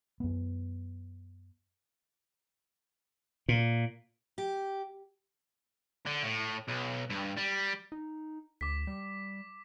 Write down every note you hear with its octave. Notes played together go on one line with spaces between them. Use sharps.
F#2 B3
A#2
G4
D3
A2
B1
G2
G3
D#4
D2 D6 B6
G3